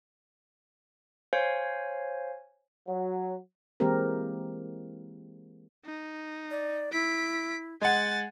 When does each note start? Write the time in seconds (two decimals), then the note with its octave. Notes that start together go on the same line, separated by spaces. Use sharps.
1.33 C5 C#5 F5 G#5
2.86 F#3
3.80 E3 G#3 A#3 C4 G4 A#4
5.85 D#4
6.51 D5
6.93 E4 B6 D7
7.81 G#3 F#5 G#5 A6